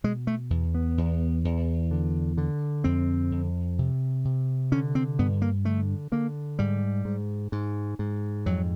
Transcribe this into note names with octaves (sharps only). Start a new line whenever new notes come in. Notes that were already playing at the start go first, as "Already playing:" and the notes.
B2 G#3
A3
E2
B3
E2
E2
D3
D3
F2 C4
F2
C3
C3
D3 C#4
C4
G2 B3
A#3
D3 A3
D3 A#3
G#2 G3
G#2
G#2
G#2
F2 F#3